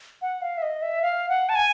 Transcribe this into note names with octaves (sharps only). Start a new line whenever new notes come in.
F#5
F5
E5
D#5
E5
F5
F#5
A5
G#5